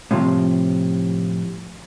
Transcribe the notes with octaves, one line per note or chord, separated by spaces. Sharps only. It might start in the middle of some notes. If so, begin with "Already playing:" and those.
A2 C3 F3